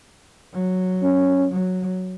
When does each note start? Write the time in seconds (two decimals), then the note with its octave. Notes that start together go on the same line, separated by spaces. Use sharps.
0.53 F#3
1.03 C#4
1.52 F#3